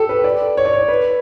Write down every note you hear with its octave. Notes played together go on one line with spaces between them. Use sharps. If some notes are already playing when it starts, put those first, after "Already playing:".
Already playing: G4 A4
B4
D5
C#5
D5
C#5
B4